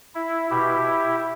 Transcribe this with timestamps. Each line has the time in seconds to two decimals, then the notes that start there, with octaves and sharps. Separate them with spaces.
0.15 E4
0.50 B2 E4 G4